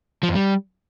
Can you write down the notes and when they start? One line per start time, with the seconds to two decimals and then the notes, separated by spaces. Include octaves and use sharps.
0.23 F3
0.29 F2
0.35 G3